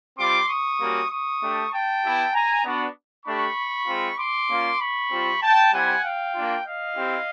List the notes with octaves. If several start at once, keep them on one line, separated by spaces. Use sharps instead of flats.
G3 C4 F4 C6 D6
C#6 D#6
G3 A#3 C#4 F#4
C#6 D#6
A3 D4 G4
G5 A5
B3 E4 G4
G#5 A#5
B3 D4 F#4
A3 D4 G4 B5 C#6
G#3 C4 F4
C6 D6
A#3 C#4 F4
B5 C#6
G3 C4 F4
G5 A5
G3 C4 E4 G4 F#5 G#5
F5 G5
A#3 D4 F4
D#5 F5
C4 E4 G4